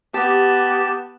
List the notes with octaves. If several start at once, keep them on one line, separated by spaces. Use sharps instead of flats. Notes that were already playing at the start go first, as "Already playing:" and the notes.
B3 G4 A5